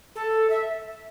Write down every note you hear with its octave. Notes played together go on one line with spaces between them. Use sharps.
A4
E5